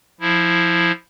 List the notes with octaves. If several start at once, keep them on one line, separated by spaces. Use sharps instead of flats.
F3 E4